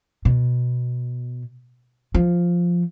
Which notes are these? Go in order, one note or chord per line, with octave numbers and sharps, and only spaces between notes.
B2
F3